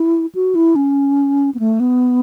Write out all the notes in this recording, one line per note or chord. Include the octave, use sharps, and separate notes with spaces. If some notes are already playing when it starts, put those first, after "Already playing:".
Already playing: E4
F#4
E4
C#4
B3
A3
B3